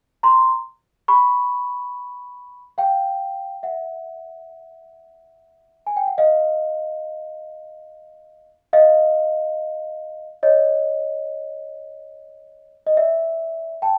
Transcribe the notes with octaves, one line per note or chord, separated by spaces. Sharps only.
A#5 C6
B5 C#6
F5 G5
E5 F#5
G#5
G5
F#5
D#5 F5
D#5 F5
C#5 D#5
D#5
D5 E5
G5 A5